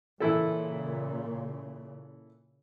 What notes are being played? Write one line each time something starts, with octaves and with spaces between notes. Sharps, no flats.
A#2 C#3 E3 E4 A4